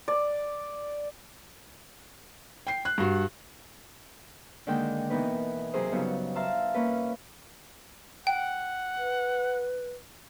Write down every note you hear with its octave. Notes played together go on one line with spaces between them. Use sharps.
D5
G5 C7
F#6
G2 F#4
D3 D#3 G#3 A#3 D#4 G5
B2 E3 B3 D#4 A#4 B4
C3 F#3 G#4 A#4 C5 D#6
G2 C#3 F#3 B3 D#4
E5 F5 A5 A#5 C6 E6
A#3 C#4 B4
F#5 G5
B4